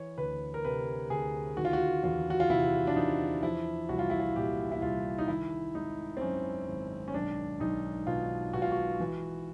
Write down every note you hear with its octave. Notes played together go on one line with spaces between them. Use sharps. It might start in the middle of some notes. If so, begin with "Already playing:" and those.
Already playing: E3 C#5
D2 B4
A#4
C3 B4
D2 G#4
D#3 F#4
F4
F#4
E2 F4
F#4
F4
C3 E4
D4
E2 D#4
F3 E4
C2 F#4
F4
E4
F4
A#2 G4
E4
C2 F4
D#4
D#3 E4
G#1 D#4
C4
F#2 C#4
G#1
C#4
B1 D4
B1 D#4
B2 F4
B2 F#4
F4
F#4
E3